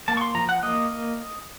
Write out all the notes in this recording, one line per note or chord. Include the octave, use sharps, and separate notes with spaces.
A#3 A5
C#6
C6
F3 A#5
F#5
A#3 D#5